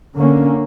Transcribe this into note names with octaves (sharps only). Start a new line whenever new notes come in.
D3 A#3 C#4